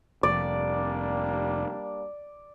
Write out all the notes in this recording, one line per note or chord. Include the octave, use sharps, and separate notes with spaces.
F1 G3 A#3 D4 D5